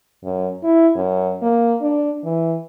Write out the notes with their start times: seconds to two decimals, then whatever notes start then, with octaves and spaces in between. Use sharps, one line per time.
0.24 F#2
0.63 E4
0.95 F#2
1.42 A#3
1.81 D4
2.24 E3